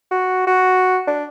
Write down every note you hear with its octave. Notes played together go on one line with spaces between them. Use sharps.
F#4
F#4
D4